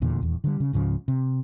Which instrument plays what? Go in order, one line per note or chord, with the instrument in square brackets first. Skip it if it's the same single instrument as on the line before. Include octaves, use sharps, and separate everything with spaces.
[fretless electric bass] D#1 E2 A#2 D3
D#1 E2
D3 G3
C#3
C#2 G#2 C#3 F3
C3